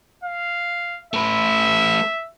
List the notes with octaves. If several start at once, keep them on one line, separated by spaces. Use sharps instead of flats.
F5
A3 B4 E5